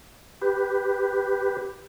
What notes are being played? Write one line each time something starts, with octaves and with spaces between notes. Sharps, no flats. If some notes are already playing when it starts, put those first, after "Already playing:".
G4 B4